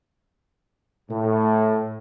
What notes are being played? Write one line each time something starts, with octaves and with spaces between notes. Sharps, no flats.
A2